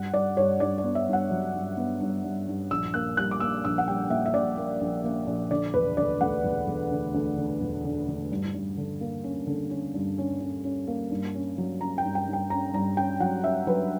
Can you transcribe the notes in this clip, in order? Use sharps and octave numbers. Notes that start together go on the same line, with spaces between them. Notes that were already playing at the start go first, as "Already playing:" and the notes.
Already playing: G2 F#5
G2 D5
G2 C#5
G2 D5
D5
B3
E5
G2
F#5
F#3
G2
B3
G2
G2
G2
A#1 E6
A#3 F#6
G3 F#6
D6
A#3 E6
A#1 E6
F#5
G3 G5
A#2 E5
E5
A#1 D5
A#3
A#1
A#3
A#1
D3 D5
E1 B4
D2 D5
D2 F#5
E1
E1
D3
D2
D3
E1
D3
D3
G2
G2
D3
A#3
C#4
D3
C#4
G2
C#4
C#4
C#4
A#3
G2
C#4
F#3
C#4 A#5
G5
G2
G5
G2
G5
C#4 A#5
G2 A#5
C#4 G5
F#3 F#5
C#4 E5
F#3 B4